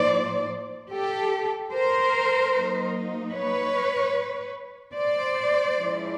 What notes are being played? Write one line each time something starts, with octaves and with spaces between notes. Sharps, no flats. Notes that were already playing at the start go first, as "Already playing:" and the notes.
Already playing: A2 F3 A#3 D#4 C5 D5
G4 A4
A#4 C5
F#3 A#3 D#4
B4 C#5
C5 D5
F3 G#3 C#4 E4